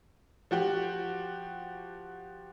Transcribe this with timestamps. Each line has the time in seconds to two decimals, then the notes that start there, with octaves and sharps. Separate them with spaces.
0.51 F3 F#4 G4